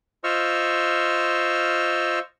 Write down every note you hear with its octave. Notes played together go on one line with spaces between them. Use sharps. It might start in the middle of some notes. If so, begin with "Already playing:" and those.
F4 C5 D#5 C#6 E6 F6